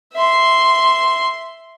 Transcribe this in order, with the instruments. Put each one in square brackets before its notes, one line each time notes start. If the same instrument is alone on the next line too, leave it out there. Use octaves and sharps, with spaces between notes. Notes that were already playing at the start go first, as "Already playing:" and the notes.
[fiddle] E5 C6